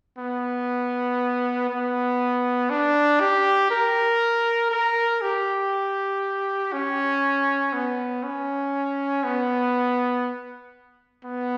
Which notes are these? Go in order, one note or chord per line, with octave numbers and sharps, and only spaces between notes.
B3
B3
D4
G4
A#4
A#4
G4
C#4
B3
C#4
B3
B3